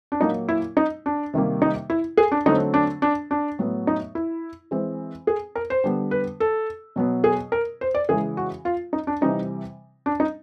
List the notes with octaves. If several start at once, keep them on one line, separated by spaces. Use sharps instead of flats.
D4
A#2 F#3 A#3 D#4
E4
D#4
D4
C3 D#3 G3 A#3
D#4
E4
G#4
D4
D3 F#3 A3 C4 D#4
D4
D4
D4
A2 F#3 B3
D#4
E4
E3 G#3 C4
G#4
A#4
C5
D3 G3 B3
B4
A4
B2 F#3 B3
G#4
A#4
C5
D5
C#3 E3 G#3 G#4
F#4
F4
D#4
D4
C3 E3 G3 C4 D#4
D4
D#4